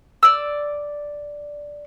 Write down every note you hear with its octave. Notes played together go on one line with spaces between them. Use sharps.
D5 E6